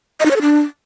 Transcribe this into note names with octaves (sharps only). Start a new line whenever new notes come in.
D#5
D#4
C#5
A4
D4